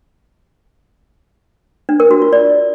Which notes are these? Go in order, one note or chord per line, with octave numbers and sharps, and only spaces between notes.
D4
A#4
F#4
F4
D5